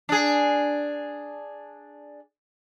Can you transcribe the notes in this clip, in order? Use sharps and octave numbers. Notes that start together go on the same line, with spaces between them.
D4 G#4